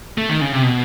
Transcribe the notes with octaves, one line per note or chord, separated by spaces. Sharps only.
A3
D#3
C#3
C3
B2